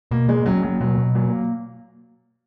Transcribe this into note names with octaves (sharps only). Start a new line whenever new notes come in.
B2 A#3
G#3 A#3
F#3 C#4
F#3 A#3
B2 F#3
B2
F#3 A#3